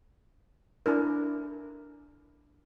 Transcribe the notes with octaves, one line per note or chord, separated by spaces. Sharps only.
D4 E4 A#4